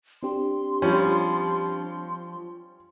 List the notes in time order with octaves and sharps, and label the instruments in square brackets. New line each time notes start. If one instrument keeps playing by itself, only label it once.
[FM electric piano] C4 D4 G4 [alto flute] C6
[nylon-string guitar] F3 [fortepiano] G3 C#4